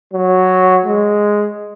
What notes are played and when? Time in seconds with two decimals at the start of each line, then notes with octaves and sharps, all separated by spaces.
0.14 F#3
0.86 G#3